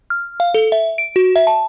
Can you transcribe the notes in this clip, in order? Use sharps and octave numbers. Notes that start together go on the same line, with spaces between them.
F6
F5
A4
E5
D7
F#4
E5
A5